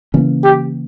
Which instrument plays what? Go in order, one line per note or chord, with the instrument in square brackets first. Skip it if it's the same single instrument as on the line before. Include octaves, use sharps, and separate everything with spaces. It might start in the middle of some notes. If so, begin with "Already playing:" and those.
[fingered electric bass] C#3 E3 A#3 C#4
[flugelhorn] G4